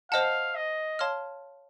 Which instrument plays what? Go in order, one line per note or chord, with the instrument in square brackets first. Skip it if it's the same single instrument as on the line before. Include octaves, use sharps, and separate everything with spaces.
[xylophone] C5 D#5 F#5 A5 [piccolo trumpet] F5
[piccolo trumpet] D#5
[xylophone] C#5 F5 A5 C6 F6